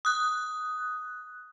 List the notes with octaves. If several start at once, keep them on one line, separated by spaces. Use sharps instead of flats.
D#6 F#6